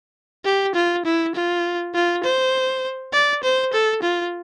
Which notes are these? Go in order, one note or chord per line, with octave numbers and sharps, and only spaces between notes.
G4
F4
E4
F4
F4
C5
D5
C5
A4
F4